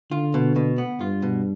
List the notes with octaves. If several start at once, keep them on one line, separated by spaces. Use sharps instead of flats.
D3 F4
B2
B2
B3
G2 F4
B2